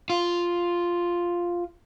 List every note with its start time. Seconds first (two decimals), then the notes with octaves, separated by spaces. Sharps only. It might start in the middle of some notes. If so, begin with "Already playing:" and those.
0.10 F4